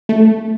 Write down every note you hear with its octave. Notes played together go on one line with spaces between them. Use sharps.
A3